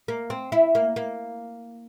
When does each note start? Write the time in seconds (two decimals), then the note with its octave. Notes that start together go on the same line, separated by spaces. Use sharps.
0.08 A#3
0.30 C4
0.52 E4
0.75 A#3
0.96 A#3